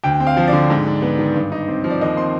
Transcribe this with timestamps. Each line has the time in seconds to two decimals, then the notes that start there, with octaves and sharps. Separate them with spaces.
0.04 D2 G5
0.20 C4
0.27 F5
0.37 F3
0.48 D5
0.53 D3
0.70 G#2
0.86 D4
1.02 B3
1.19 D#3
1.35 G2
1.52 D#4
1.68 C4
1.84 F3
1.90 D5
2.01 D#2 D#5
2.17 C4 C6